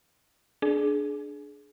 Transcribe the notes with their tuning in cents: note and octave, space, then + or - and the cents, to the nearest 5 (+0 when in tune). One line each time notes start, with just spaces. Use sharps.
D4 +0 G#4 +25